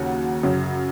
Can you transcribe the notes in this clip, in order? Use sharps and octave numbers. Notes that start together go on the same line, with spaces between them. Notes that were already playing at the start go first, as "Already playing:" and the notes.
Already playing: D#2 C#3 F#3 F#5
F#2 C#3 F#3